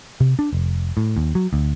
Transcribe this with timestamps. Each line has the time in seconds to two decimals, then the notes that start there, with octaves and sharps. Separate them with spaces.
0.20 C3
0.39 D4
0.53 F1
0.97 A2
1.16 D#2
1.35 F#3
1.53 D2